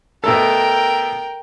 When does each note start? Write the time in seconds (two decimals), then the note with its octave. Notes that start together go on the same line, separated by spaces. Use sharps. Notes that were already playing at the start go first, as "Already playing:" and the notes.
0.24 B2 A3 A4 A#4 G5